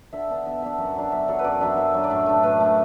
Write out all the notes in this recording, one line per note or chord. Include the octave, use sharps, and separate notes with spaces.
D3 E5
B3 D4
D3 E5
B3 D4 E5
F#2 F#5
F#3 D4
F#2 E5
F#3 D4 A4
B4
F#2 D5
F#3 D4 E5
F#2 E5
F#3 D4
D5
A2 E5
A3 D4
A2 B4
A3 D4